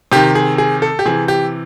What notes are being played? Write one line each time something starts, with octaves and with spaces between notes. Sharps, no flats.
C3 D#3 G4
G#4
G#4
A4
G4
C3 E3 G#4
G4